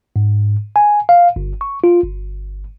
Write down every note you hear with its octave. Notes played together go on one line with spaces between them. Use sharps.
G#2
G#5
F5
G1
C#6
F4
G1